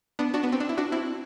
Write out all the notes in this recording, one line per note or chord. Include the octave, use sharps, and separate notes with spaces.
B3 D4
D4 F#4
B3
C4
D4
E4
D4 F#4
C4 E4